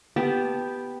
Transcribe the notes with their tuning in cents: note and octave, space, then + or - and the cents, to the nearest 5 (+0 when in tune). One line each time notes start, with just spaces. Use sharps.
B3 +0 G4 +0 A5 -15